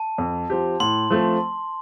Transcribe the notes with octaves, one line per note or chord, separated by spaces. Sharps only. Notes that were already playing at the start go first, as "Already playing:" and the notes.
Already playing: A5
F2
F3 C4 G4
A2 C6
F3 A3 C4